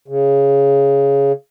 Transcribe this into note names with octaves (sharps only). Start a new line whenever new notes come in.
C#3